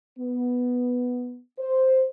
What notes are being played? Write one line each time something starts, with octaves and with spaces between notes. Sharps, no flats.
B3
C5